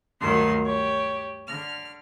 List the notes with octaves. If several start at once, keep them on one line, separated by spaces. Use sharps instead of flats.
D2 G2 D#3 F#3 C6
G4 C#5
D3 F6